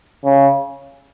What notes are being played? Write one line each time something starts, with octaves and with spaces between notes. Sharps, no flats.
C#3